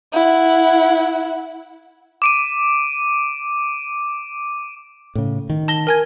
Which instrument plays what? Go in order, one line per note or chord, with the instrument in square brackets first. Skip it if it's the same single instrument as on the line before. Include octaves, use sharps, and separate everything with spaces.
[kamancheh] E4 F#5
[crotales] D6 D7 D#7
[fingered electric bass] A2 C#3
D#3
[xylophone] A5 A#6 G7
A#4 G#5 G#6